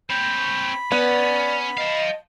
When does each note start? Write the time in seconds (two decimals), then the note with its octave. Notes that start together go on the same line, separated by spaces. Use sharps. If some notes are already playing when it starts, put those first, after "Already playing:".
0.10 C4 C#5 B5 G6
0.92 B3 C#4 D5
1.77 D#5 F5 A5